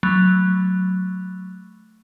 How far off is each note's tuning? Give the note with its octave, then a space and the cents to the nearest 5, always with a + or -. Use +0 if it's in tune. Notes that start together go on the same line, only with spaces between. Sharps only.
F#3 +0 A3 +0